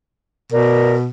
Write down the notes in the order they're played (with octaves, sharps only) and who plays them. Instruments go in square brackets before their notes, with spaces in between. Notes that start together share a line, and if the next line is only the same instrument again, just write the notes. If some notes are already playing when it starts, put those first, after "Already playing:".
[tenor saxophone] B2 [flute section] A#4 D5